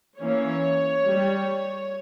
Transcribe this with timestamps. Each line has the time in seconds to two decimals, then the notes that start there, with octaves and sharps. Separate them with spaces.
0.19 E3 A#3 C#4 C#5
1.05 G3